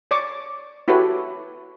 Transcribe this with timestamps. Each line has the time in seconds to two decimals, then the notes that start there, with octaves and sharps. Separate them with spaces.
0.11 C#5 D5 C#6 D6
0.88 E4 F#4 G4 A4 B4 C#5